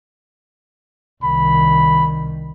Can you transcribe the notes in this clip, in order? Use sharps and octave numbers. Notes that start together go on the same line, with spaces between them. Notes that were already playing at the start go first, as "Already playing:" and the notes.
C2 D#3 B5